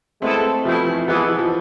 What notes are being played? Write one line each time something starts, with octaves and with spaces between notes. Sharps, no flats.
G#3 A3 B3 C4 E4 A4
B2 F3 A3 C4 E4
E3
E3 F3 G#3 B3
E3
F3